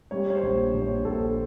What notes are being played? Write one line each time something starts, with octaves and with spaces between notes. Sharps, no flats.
G3 C#5
C#5
C5
A#1
A#1
C#5
A#1 A4